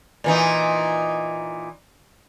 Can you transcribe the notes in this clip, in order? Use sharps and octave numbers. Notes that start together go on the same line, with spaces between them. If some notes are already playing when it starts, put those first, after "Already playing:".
A#2 E3 D#4